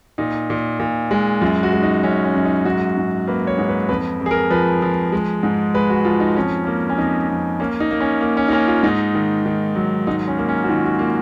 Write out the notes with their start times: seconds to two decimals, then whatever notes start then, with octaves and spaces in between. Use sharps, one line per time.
0.18 A#2 D#4
0.50 A#2
0.80 A#2
1.11 G#3
1.41 F#2 F4
1.63 F#4
1.73 G#3
1.83 D#4
2.03 F#2 C#4
2.25 C#4
2.35 F#2
2.45 D#4
2.65 G#2 F#4
2.97 G#2
3.27 A#3 B4
3.47 C#5
3.58 G#2
3.69 B4
3.89 F2 B4
4.21 F2
4.26 G#4
4.31 A#4
4.50 F3 B4
4.82 F3
5.12 G#3
5.43 G#2
5.75 G#3 B4
5.90 F#4
6.05 F3 F4
6.20 D#4
6.36 F2 C#4
6.65 A#3 C#4
6.89 C#4
6.98 F2 D#4
7.29 F2
7.60 A#3 C#4
7.80 D#4
7.91 A#3
8.00 C#4
8.21 A#3
8.37 C#4
8.48 D#4
8.52 A#3 C#4
8.68 F4
8.83 G#2 D#4
9.15 D#3
9.46 D#3
9.76 F#3
10.07 G#2 D#4
10.28 C#4
10.38 A#3
10.49 C#4
10.64 F#4
10.68 D#3 F4
10.84 F#4
10.99 A#3 F4